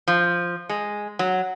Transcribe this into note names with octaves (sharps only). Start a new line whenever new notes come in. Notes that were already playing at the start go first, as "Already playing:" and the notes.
F3
G#3
F#3